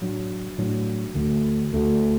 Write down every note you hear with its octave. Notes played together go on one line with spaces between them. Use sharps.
A2 F#3 D4
A2 F#3 D4
D2 D3 A3 F#4
D2 D3 A3 F#4